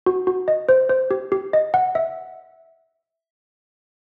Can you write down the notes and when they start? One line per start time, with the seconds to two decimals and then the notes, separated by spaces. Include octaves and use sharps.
0.06 F#4
0.27 F#4
0.48 D#5
0.69 C5
0.89 C5
1.11 G4
1.32 G4
1.53 D#5
1.74 F#5
1.95 E5